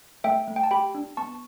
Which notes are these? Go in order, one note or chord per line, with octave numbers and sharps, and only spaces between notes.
A3 E5 G5
A3
G5
A5
G4 G5 B5
D4
B3 A5 C#6